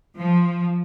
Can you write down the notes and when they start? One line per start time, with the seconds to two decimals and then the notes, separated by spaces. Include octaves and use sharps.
0.17 F3